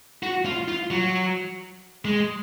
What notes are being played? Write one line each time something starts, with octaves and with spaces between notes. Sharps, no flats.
F#4
F4
F4
F#3
G#3